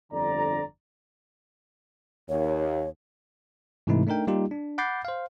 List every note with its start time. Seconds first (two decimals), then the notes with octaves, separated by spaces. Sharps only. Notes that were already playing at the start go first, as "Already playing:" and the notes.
0.12 G1 F2 D3 D5 A#5
2.29 D#2 C#5
3.87 G#2 C3 E3 A3 D#4 E4
4.07 A3 D4 D#4 A#4 G5
4.27 G3 A#3 D#4 F4 G4
4.51 D4
4.78 F#5 B5 D6 G6 A6 C7
5.05 C5 F5